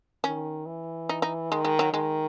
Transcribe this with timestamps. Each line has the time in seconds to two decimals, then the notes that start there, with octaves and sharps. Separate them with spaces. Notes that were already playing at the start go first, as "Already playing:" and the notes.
0.24 D#3 C#4
0.66 E3
1.09 D#4
1.22 D#4
1.51 D#3 G#3
1.65 G#3
1.79 F#3
1.93 D#3 G#3